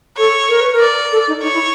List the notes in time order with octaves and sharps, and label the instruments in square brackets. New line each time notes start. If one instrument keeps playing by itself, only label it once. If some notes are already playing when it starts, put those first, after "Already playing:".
[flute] A4 [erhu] C#5
[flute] A#4
B4
A#4
[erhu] D5
[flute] A4
D#4
[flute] D#4 [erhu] C#5
[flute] E4